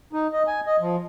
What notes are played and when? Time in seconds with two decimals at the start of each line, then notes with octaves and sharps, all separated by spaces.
0.13 D#4
0.33 D#5
0.47 G#5
0.67 D#5
0.80 F3